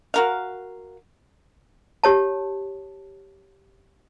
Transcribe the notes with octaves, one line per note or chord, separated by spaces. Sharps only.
F#4 A#4 F5
G4 C#5 A5